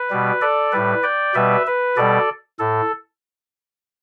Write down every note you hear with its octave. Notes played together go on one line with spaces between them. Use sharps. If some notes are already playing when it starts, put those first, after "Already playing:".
Already playing: B4
B2 G3
A4 D5
A2 G3 B4
D5 G5
B2 G3 B4 E5
B4
B2 G3 A4 D5
A2 A4